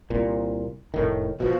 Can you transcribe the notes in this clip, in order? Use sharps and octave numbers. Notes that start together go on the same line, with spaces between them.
C2 A#2
F1 A2 D#3
B2 F3 F#4